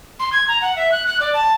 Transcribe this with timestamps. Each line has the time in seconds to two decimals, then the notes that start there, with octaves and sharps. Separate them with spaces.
0.20 C6
0.33 G#6
0.48 A#5
0.62 F#5
0.76 E5
0.92 F#6
1.07 F#6
1.20 D5
1.34 A5